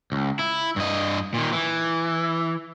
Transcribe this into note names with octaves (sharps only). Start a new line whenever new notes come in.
C#2
E4
G2 D#5
A#2 D#3
E3